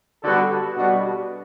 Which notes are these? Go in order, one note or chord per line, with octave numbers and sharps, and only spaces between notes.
D3 G3 B3 F#4 A4
B2 G3 B3 D4 F#4